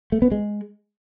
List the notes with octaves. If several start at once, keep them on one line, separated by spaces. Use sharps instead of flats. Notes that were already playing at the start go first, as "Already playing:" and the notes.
A3
B3
G#3